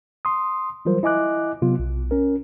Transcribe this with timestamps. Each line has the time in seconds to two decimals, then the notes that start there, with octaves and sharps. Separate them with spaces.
0.25 C6 D#6
0.85 E3 F#3 G3 F4 A#4 C5
1.03 E4 D#5 G#5 D6 F#6
1.62 C3 F#3 B3 F4
1.79 B1
2.11 C#4 A#4